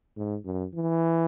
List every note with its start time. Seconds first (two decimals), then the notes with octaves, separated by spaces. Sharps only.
0.16 G#2
0.45 F#2
0.74 E3